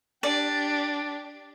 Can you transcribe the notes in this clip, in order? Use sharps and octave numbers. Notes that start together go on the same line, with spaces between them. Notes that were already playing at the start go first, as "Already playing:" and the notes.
D4 G4 D5